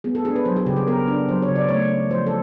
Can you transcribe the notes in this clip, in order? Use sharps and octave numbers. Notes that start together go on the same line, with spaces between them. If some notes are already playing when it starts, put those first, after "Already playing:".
B3 G#4
A4
D4 G#4
B4
F#3 C5
G#4
C#3 G4
G#4
B3 A#4
D4
F#3 C5
C#5
C#3
D5
A3 C#5
C#4
F3 C5
A4